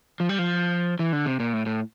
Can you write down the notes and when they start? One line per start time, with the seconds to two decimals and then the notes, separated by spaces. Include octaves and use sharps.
0.20 F3
0.29 G3
0.39 F3
0.99 E3
1.13 D3
1.26 C3
1.40 A#2
1.53 A2
1.66 A2